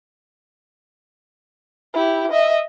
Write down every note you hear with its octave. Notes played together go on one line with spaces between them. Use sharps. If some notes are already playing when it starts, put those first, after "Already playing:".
E4 G4
D#5 E5